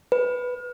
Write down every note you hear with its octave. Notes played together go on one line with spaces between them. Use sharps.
B4